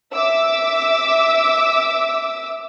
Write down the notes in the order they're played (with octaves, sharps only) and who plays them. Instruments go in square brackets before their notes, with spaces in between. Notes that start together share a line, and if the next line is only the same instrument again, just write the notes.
[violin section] E5 D6 E6